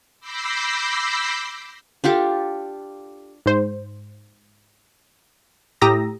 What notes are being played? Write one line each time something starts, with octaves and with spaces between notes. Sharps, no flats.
B5 D6 E6 G6 A#6 C7
D4 F4 G4 A4
G#2 C5
A2 G4 A#5 D#6 E6 A#6